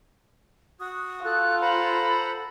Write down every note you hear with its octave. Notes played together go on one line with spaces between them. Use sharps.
F#4 D#6
F4 A4 F#6
C5 F#5 A#5 B5